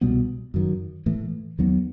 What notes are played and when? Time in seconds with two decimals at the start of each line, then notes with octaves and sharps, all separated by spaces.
0.01 C2 B2 G3 B3
0.54 F#2 D#3 F#3
1.06 A2 E3 A3
1.58 D#2 D#3 F#3 B3